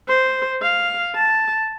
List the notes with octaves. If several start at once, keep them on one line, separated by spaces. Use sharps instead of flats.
C5
F5
A5